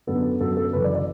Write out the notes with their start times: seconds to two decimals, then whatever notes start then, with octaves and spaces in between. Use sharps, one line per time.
0.07 F#2 D3 B3 A4
0.41 F#2 D3 B3 A4
0.57 A4
0.73 F#1 F#2 E3 B4
0.84 D5
0.95 D5